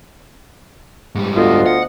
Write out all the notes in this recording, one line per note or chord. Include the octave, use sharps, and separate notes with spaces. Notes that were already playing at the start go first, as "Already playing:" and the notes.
G#2 G3
D2 B3 F4 D#5
F#5